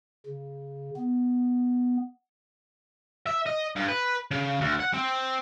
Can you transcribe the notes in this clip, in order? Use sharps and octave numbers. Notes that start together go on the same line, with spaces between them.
C#3
B3
E5
D#5
G2
B4
C#3
D2
F#5
C4